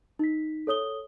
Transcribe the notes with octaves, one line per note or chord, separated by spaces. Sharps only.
D#4 B6
A4 C#5 D#6 G7